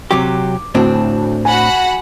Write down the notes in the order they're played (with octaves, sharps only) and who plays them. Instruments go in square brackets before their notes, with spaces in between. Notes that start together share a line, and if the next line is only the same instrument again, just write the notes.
[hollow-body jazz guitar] C3 F#3 G4 [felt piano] D6
[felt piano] D2 A5 [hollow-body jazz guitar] A2 C4 D4
[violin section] F#4 F#5 B5 [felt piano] G#5